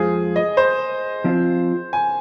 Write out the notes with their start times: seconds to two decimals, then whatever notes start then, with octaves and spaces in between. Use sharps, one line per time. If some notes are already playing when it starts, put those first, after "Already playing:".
Already playing: F2 F3 G#3 F4 G#4 C5
0.36 D#5
0.57 C5
1.24 F3 C4 F4
1.93 G#5